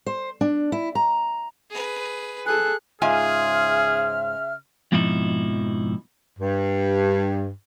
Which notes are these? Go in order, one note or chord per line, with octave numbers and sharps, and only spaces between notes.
C5
D4
E4
A#5
G#4 B4
G#4 A4 F#6
G#2 C#3 F4 G#4 E5 G#5 F6
F2 G#2 B2 F3 D#4 E4
G2